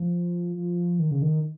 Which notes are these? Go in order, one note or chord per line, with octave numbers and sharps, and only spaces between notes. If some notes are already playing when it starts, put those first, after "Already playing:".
Already playing: F3
F3
D#3
C#3
D#3